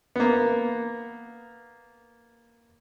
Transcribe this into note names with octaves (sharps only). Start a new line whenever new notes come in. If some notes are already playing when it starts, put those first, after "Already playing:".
A#3 B3